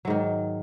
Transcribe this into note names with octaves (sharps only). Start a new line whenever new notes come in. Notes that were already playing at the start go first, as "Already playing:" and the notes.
G#2 D#3 F#3